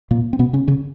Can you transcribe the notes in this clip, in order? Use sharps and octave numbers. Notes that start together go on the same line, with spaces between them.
A#2 A#3
C4
B2 B3
C#3 C#4
C#3 C#4